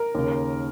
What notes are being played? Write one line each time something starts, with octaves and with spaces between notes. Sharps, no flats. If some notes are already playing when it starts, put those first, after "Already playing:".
Already playing: A#4
D#2 C#3